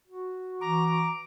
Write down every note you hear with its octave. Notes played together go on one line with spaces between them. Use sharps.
F#4
E3 A#5 D6